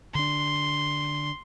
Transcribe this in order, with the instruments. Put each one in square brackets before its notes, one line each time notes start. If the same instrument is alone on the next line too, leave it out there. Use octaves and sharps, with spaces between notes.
[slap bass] D3 D4 [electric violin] C6